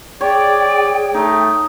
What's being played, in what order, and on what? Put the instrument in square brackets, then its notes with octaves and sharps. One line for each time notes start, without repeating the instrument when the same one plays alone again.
[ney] G#4 [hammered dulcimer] C#5 [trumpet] D5 [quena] G5
[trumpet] A3 [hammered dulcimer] D#4